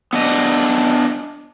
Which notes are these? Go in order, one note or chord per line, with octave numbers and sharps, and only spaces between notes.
B3 D4 D#5